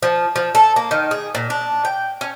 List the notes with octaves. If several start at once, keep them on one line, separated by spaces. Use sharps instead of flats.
F3
F3
A4
A#3
D#3
G#4
A#2
D4
G5
C#4